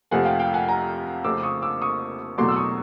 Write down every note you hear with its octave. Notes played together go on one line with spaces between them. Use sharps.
F2 C3 F3 A3 C4 F#5 G#5
F5 G5
F5 G5
F#5 G#5
G#5 A#5
F2 C#3 F3 A3 C4 D6 E6
C#6 D#6
D6 E6
C#6 D#6
E2 B2 F#3 A3 C6 D6
E6
C#6 D#6